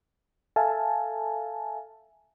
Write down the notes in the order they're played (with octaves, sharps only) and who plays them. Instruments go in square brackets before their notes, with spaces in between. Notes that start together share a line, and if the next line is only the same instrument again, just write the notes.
[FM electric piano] A4 E5 F5 G#5 A5